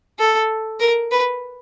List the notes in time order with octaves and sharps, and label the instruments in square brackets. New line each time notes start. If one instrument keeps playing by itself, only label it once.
[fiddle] A4
A#4
B4